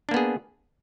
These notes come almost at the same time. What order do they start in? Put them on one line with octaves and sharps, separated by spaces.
D4 A#3 B3 G#4